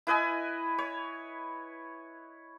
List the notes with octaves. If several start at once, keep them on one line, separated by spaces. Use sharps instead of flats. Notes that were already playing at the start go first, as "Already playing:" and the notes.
E4 B4 D#5 G#5
C#5